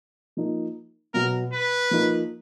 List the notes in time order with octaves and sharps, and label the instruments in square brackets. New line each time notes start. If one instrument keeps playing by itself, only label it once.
[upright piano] F3 A#3 D#4
[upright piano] B2 F#3 B3 [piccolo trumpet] A#4
[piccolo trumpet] B4
[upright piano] F3 A#3 D#4